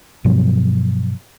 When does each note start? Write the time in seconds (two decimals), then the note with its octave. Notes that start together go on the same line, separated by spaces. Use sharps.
0.24 G2 B2 F3 F#3